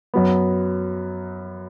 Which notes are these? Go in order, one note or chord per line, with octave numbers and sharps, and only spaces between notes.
F#2 F#3 B3